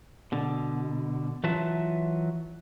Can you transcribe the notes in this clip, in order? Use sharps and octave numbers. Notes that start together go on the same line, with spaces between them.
B2 D3
E3 F#3 F4 B4 E5 A5